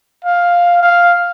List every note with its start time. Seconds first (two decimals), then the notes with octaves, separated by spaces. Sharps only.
0.24 F5
0.83 F5